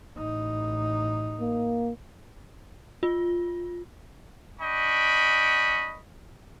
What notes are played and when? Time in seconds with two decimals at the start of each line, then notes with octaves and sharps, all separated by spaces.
0.17 A1 D#4
1.41 A#3
3.03 F4
4.60 D4 D#5 G5 B5 C#6